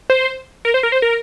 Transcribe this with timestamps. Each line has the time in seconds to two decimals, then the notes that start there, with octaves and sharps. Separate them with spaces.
0.10 C5
0.65 A#4
0.74 C5
0.83 A#4
0.92 C5
1.02 A#4